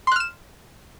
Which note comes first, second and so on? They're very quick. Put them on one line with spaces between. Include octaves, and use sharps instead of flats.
C6 F#6 F6 E7